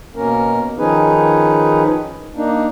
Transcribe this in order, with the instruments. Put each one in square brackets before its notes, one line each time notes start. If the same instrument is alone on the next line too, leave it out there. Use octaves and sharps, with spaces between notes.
[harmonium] B2 A#3 C#4 A#4
D#3 F3 C#4 D#4 G#4 B4
A#3 D4 D#4